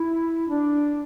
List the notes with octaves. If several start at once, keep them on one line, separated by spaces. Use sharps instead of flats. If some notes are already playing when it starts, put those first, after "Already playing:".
Already playing: E4
D4